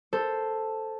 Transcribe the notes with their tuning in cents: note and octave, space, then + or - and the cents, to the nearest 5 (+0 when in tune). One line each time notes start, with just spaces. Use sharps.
A4 +0 C5 +0